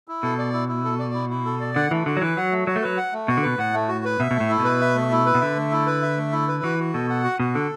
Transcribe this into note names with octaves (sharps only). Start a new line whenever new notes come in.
E4
B2 A4
D5
E4
E4
A4
D5
E4
E4
A4
D5
D3 F#5
E3 A3
D3 F#4
F#3
E3 B4
F#3 F#5
A3
F#3 F#4
A3
F#3 B4
F#5
A3
B2 F#4
D3
B2 B4
A2 F#5
A3
F#4
B4
B2 E5
B2
A3
A2
E4
B2 B4
E5
A3
E4
B4
B2
D3 E5
A3
E4
B4
E5
A3
E4
B4
E3 F#4
F#4
B2 A4
F#5
F#4
B2 F#4
D3 A4